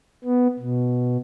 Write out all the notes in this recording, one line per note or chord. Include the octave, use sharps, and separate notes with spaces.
B3
B2